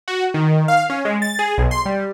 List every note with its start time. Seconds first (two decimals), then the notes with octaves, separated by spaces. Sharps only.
0.08 F#4
0.34 D#3
0.68 F5
0.90 C#4
1.05 G#3
1.22 A6
1.39 G#4
1.58 B1
1.71 C6
1.86 G3